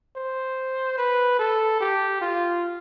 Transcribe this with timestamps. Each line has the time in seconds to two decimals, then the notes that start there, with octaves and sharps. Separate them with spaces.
0.16 C5
0.98 B4
1.39 A4
1.81 G4
2.21 F4